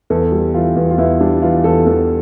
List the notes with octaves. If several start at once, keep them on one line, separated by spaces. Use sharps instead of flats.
E2 A4
G3
E3 F4
E2
F4
E2 E4
G3 D4
E3 F4
E2 A4
E2 A4